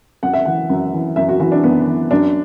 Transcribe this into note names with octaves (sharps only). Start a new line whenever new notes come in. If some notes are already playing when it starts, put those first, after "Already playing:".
F#2 F#5
E5
E3 F#5
F#2
E3
F#2 E5
F#4
E3 F#4
D4
F#2 B3
E3
F#2 D4